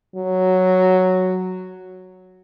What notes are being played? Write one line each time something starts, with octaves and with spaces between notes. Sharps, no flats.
F#3